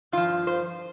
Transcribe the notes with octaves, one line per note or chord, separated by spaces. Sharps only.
G2 F3 F4
C5